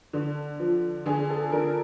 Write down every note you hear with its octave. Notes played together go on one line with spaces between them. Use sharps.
D3
F3
D3 G#4
A4
D3 A#4